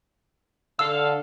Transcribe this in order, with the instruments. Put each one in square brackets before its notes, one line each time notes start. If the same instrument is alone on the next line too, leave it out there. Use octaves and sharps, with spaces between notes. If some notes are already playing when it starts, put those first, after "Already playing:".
[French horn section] D3 [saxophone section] A4 F5 [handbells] E6